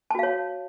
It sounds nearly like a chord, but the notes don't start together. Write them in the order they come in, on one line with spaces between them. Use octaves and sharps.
A5 F#4 F5 C#5